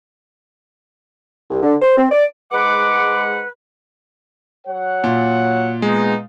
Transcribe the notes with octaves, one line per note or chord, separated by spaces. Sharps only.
C2
D3
C5
C4
D5
G#2 G#3 B4 F#5 D6
F#3 C#5 F#5
A#2
G#3 B3 D#4